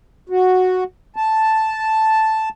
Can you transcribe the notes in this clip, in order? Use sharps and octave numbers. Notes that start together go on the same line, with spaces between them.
F#4
A5